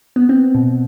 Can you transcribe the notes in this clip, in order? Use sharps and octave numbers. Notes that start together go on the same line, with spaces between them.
B3
C4
B2